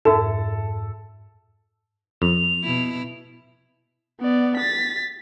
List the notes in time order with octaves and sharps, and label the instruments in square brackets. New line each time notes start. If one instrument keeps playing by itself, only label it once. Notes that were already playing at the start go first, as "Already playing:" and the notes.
[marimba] F2 G#2 E5 [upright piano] A4
[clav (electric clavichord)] F2 [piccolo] F7
[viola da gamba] B2 E4
[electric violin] B3 D5
A6 B6